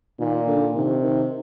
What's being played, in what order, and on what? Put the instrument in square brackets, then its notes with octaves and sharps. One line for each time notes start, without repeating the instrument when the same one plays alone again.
[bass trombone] A#2 [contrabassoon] D#3
[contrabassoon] D3
[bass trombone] C3 [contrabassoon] D#3
[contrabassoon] D#3